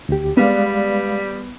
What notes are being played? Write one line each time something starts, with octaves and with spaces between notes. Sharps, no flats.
D2 G4
G3 G#3 B3 D5 F5